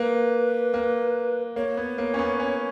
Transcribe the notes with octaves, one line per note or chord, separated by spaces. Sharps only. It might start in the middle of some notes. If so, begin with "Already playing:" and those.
Already playing: A#3 B4
A#3
A#3 C#5
B3
A#3
C#4
B3
C#4